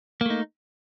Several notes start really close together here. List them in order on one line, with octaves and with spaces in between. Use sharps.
A#3 A3 D#4